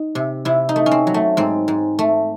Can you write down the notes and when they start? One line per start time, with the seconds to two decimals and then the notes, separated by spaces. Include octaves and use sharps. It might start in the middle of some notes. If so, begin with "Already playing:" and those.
Already playing: D#4
0.15 C3
0.45 C3 E4
0.69 D#4
0.76 A3
0.86 C#4
0.91 C4
1.07 F#3
1.14 A3
1.37 G#2 C4
1.68 G#2
1.99 A3